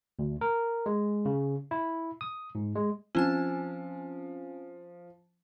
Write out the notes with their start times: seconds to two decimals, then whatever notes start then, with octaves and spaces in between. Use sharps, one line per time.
0.19 D2
0.41 A#4
0.86 G#3
1.25 C#3
1.71 E4
2.21 D#6
2.55 G#2
2.75 G#3
3.15 F3 C4 C#4 G#5